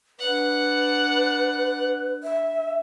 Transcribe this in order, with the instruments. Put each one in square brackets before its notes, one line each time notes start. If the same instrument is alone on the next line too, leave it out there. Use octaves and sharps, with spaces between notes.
[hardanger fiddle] D4 F#5 [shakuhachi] B4
[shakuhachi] E5